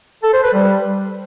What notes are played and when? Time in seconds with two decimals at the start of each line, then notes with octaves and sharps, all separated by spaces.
0.23 A4
0.33 C5
0.43 B4
0.53 G3